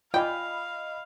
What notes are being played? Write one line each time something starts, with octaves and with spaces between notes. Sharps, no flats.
F4 D5 D#5 F5 G5 G#5 B5